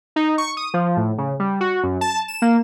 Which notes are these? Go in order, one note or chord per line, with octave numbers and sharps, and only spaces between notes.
D#4
C#6
D#6
F3
A2
C#3
G3
F#4
F#2
A5
E7
A#3